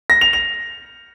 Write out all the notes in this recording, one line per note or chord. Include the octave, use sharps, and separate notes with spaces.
A#6
F7
F7